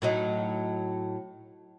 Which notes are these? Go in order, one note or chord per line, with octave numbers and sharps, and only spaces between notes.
A2 F#3 D#4